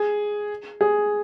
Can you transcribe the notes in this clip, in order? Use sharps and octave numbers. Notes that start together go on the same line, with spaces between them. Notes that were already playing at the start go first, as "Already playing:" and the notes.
Already playing: G#4
G#4